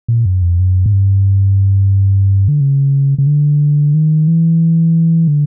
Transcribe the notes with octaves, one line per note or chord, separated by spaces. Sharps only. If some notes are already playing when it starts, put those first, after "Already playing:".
A#2
F#2
F2
F#2
G#2
G2
D3
C#3
C#3
D3
D#3
E3
D3